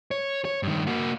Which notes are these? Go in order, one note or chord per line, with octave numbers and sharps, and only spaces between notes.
C#5
C#5
G2 D#3
A#3 F#4